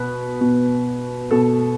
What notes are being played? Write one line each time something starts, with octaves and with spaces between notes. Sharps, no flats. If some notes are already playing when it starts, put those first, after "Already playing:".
Already playing: B2 B4
B2
B2 A4